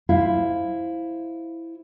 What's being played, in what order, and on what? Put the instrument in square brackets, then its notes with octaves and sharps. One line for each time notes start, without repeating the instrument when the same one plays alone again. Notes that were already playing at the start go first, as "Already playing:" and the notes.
[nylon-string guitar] E4 C5 E5 F5